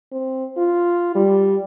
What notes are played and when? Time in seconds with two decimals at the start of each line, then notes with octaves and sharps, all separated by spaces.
0.12 C4
0.57 F4
1.15 G3